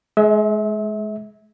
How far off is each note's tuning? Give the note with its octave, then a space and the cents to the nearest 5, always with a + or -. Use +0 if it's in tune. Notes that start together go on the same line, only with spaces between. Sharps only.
G#3 +25 E5 -30